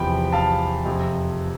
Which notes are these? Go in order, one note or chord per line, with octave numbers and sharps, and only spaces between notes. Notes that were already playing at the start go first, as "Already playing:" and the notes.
Already playing: E2 C3 F3 G5 B5
F5 A5
F2 C3 F3